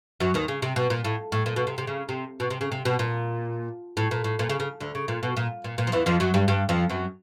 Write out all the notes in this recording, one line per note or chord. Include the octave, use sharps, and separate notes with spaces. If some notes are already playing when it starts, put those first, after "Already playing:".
F#2 F#3
D#2 D#3
C#3
C3
B2
A#2
A2
A2
A#2
B2
C3
C3
C#3
C3
B2
C3
C#3
C3
B2
A#2
A2
A#2
A2
A#2
C#3
C#3
D2 D3
C#3
A#2
B2
A#2
A#2
A#2
F3
E2 E3
F2 F3
F#2 F#3
G2 G3
G2 G3
F2 F3
F#2 F#3